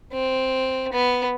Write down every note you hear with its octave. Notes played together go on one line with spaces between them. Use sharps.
C4
B3